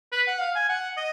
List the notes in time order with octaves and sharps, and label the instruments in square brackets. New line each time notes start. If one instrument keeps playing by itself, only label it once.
[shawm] B4
F#5
F5
G#5
F#5
D#5